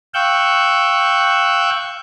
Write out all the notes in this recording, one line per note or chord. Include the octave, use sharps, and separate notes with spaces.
F5 G5 C#6 E6 F#6 G6